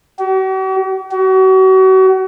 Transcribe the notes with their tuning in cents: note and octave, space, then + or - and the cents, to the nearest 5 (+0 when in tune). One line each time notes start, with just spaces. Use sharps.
F#4 +45
F#4 +35